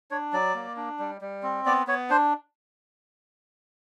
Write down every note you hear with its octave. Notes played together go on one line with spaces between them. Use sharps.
D4 C#5
F#3 D5
A#3
D4
G3
G3
C4
B3 D5
B3 C#5
D4 C5